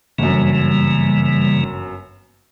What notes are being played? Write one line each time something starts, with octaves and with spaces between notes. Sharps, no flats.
G1 F#2 C#3 E3 G3 A#3